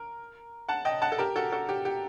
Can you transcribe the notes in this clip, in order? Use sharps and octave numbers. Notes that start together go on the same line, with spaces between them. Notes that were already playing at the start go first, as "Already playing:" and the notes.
Already playing: A#4
F#5 A5
D#5 G5
F#5 A5
A4
G4 A#4
F#4 A4
F#4 A4
G4
G4